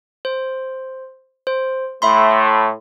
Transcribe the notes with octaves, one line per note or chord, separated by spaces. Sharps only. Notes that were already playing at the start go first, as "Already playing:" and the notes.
C5
C5
A2 A3 E5 B5 C6